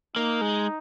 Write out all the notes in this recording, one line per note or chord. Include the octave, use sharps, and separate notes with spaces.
A#3 D#4
G#3